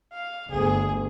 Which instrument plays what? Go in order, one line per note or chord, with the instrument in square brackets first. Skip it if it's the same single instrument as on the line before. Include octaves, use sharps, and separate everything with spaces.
[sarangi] F5
[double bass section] G1 D2 [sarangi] G#4